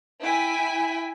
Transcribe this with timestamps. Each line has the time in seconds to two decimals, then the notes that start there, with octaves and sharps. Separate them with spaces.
0.22 E4 G5 G#5 B6